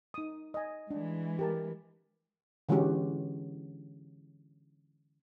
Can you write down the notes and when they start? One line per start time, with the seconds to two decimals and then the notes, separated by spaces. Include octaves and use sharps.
0.14 D#4 D#6
0.54 D#5 G#5
0.91 E3 G#3 D4
1.39 G4 A#4 A5
2.69 D3 E3 G#3 C#4 F#4 G4